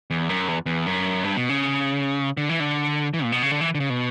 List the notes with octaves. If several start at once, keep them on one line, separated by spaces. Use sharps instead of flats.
E2
F#2
E2
E2
F#2
G2
B2
C#3
D3
E3
D3
E3
A#2
B2
C#3
D3
E3
D3
C#3
B2